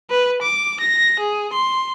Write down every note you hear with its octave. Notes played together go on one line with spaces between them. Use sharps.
B4
D6
A#6
G#4
C6